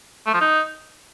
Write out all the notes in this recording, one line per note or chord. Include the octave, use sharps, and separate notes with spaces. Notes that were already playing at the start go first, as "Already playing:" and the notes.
A3
F3
D#4